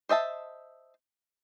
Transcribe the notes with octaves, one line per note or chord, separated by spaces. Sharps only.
C5 D#5 E5 A5